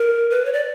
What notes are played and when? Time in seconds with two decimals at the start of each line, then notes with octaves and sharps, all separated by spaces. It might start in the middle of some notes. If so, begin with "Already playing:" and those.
Already playing: A#4
0.30 B4
0.45 C#5
0.53 D5